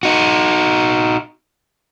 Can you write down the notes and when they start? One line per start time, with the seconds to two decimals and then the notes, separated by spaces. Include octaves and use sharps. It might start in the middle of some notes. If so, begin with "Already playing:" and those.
0.03 D#4 F#4